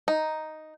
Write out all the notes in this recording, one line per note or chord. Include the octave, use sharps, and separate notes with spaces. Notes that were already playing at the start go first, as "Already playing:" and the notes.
D#4